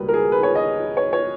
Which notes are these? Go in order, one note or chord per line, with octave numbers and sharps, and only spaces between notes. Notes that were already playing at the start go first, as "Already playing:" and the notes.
Already playing: C#2 B2 G3 A#3 B4
A#4
G#4
B4
C#5
D#5
C#5
C#5